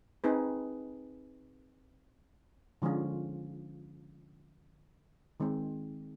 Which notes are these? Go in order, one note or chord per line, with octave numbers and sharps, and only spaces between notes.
C4 D#4 G#4 B4
D3 F3 G#3 C#4 F4
D#3 G#3 C4